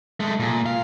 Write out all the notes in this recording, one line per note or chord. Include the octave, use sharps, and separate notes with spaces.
G#3 A3
A#2
F5